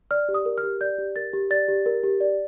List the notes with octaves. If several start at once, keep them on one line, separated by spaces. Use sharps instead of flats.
D5 F6
G4
D#6
A#4
F6
G4
D5 G6
G4
A#4 A6
G4
D5 A6
G4
A#4
G4
D5